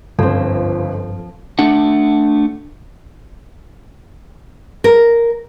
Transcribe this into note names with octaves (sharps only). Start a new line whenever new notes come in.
G1 C#2 G2 F3 C4 A4
A3 D4 F#5
A#4